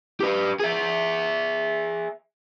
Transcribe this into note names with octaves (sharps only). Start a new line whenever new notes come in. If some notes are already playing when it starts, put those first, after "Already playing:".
G4 B4
G#4 E5